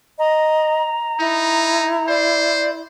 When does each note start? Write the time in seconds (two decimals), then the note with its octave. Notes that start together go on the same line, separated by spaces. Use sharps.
0.18 D#5 A#5
1.19 D#4 E4
2.08 C5 D5